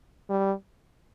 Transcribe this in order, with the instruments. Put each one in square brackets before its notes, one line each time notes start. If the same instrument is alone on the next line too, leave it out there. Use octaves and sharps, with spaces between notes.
[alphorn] G3